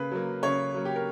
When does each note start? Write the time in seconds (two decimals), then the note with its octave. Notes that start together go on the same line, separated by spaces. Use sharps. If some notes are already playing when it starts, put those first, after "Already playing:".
Already playing: C#3 A#3 B4
0.11 F#3 A#3
0.43 C#3 C#5
0.74 F#3 A#3
0.85 G4
0.96 A#4